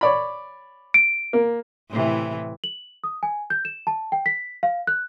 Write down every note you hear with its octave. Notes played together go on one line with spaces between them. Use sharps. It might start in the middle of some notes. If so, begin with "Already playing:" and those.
C#5 D5 B5
D7
A#3
A2 C3 E3
F#7
D#6
G#5
G6
E7
A5
G5
B6
F5
F#6